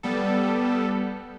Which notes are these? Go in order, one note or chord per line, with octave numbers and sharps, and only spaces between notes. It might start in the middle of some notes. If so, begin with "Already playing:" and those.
G3 B3 A4